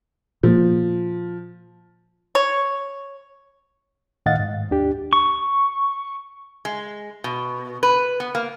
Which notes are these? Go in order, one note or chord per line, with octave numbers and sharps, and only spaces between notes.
A#2 F3 A#3
C#5
A2 D#3 D#5 F5 F#5 A6
G#2
D#2 D4 G4
C#6
G#3
B2
B4
B3
A#3